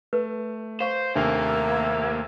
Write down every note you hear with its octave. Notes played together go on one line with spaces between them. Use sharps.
A3 B4
C5 F5 C#6
D#2 C3 A3 A#3 D4 E5